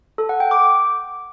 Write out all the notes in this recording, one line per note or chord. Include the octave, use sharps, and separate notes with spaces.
A4
F#5
G5
D6